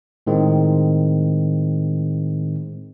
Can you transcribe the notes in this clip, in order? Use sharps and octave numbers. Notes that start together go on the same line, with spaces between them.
A2 D#3 G#3 C4